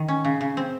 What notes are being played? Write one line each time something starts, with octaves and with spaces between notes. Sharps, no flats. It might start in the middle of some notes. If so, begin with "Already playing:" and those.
Already playing: D#3
C#4
C#3
C#3
C4